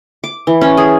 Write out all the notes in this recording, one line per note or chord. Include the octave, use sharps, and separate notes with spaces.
D6
E3
C#4
G#4